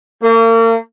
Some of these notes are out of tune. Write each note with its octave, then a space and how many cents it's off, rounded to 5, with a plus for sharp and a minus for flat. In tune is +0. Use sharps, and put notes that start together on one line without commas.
A#3 -40